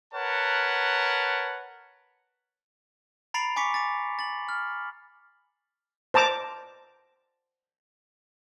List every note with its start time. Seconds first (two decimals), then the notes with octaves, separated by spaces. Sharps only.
0.14 A#4 B4 C#5 F#5 A5
3.34 A#5 B5 A6 C7 D7 F7
3.56 G#5 C#6 D6 B6 C#7
3.74 D6 A6
4.19 A6 F#7
4.49 F6
6.14 C5 A5 A#5 D6